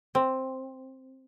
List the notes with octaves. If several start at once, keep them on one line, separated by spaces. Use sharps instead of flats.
C4